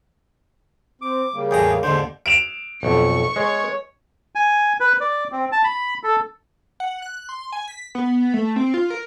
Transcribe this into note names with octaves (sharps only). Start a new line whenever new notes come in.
C4 D6
C#3 G3 A#3
E2 A2 G#4 G5 A#5
D#2 G#2 D3 C5
D7 E7 F7
B1 F2 C#6
G#3 C#5
G#5
B4
D5
C4
A5
B5
A4
F#5
F#6
C6
G#5
B6
B3
A3
C4
F4
A#4